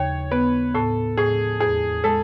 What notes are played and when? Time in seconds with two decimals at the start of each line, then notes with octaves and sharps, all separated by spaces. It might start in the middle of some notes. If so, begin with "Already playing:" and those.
Already playing: D#2 C#3 C#5
0.31 B3 B4
0.74 A2 A4
1.17 A2 G#4
1.60 E2 G#4
2.04 G#3 A4